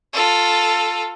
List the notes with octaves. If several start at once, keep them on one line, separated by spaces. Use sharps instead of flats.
F4 A4